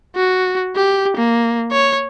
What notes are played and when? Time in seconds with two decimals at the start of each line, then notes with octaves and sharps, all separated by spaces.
0.16 F#4
0.76 G4
1.17 A#3
1.72 C#5